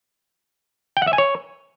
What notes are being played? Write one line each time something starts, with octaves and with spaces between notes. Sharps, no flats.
G5
F#5
E5
G#5
C#5